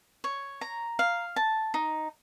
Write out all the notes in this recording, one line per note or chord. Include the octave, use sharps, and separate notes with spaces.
C#5
A#5
F5
A5
D#4